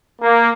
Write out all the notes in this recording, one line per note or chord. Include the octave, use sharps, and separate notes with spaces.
A#3